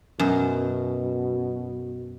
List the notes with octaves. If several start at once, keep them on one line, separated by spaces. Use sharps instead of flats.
F#2 B2